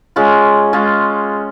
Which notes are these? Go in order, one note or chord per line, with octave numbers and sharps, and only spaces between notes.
G#3 C#4 F4
G#3 C#4 F4